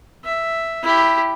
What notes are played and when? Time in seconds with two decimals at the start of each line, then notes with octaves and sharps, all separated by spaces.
0.25 E5
0.83 E4 G4